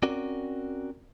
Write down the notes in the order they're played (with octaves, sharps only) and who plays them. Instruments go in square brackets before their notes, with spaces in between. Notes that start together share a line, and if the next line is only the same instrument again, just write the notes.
[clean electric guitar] C4 C#4 F#4 A#4 D5